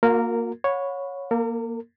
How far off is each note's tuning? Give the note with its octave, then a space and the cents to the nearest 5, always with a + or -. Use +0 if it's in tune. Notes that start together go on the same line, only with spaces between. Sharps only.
A#3 +0 F#4 -45 A#4 -15
C#5 +0 F#5 -40 B5 +10
A#3 +10 A#4 -40